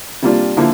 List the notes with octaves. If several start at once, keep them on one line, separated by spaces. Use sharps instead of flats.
C3 G3 A#3 D4 F4
D3 F3 A#3 E4